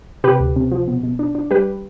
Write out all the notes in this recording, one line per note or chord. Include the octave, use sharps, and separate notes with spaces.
C3 G4 B4
D2
C3
F3
B2
B2
D4
D4
G3 G4 B4